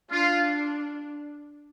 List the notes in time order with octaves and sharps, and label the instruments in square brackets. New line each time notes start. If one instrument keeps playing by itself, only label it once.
[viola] D4 [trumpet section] F4